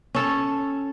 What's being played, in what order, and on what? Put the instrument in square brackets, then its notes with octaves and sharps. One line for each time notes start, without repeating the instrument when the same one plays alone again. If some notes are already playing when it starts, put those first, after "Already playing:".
[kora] C#4 A4